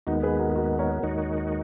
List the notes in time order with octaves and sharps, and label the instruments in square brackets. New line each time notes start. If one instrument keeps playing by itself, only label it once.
[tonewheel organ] D#2 D#3 G#3 B3 [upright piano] D#4 F#4
[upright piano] G#4 B4
F#4 A#4
G#4
F#4 A#4
A#4 C#5
[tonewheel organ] D#2 D#3 G#3 D#4 F#4